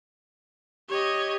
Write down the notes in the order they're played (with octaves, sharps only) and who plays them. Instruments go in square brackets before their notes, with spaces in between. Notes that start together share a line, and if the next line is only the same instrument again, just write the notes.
[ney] G4 [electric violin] C#5 D#5